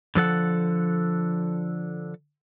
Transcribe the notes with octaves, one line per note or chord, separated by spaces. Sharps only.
D3 F3 A4 F#5